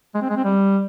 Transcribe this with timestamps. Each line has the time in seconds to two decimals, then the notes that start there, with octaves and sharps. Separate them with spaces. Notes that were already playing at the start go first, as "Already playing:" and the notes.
0.14 G#3
0.22 C4
0.29 G#3
0.37 C4
0.44 G3